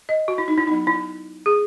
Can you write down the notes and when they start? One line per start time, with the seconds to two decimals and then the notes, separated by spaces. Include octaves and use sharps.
0.09 D#5
0.28 F#4
0.38 E4
0.48 D#4
0.58 E4
0.67 F#3 B3 D#4
0.87 E4
1.46 G#4